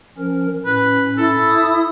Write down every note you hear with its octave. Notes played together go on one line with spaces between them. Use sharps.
F3 C#4 A#4
A2 C#4 B4
E4 A4
D#6